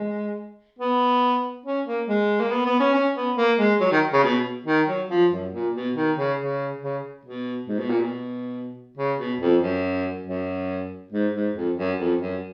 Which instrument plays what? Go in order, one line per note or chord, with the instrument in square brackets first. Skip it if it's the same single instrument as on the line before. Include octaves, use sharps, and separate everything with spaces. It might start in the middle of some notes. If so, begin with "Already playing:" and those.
Already playing: [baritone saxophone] G#3
B3
C#4
A#3
G#3
A#3
B3
B3
C#4
C#4
B3
A#3
G#3
F#3
D#3
C#3
B2
D#3
F#3
F3
F#2
A#2
B2
D#3
C#3
C#3
C#3
B2
G#2
B2
A#2
B2
C#3
B2
F2
F#2
F#2
G#2
G#2
F2
F#2
F2
F#2